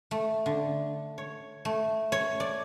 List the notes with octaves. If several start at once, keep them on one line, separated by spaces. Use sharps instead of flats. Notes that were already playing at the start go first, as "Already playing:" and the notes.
A3
D3
C#5
A3
C#5
D5